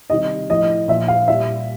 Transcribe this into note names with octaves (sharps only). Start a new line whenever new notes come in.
C3 D#3 G3 D#5
A2 F3 D#5
A#2 F3 E5
F5
A#2 G3 E5